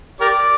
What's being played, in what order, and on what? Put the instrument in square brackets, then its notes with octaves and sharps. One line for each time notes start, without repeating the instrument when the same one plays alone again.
[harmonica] G4 A#4 D5